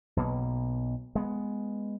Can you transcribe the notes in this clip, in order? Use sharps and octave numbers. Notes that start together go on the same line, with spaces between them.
B1 B2 A#3
G#3 B3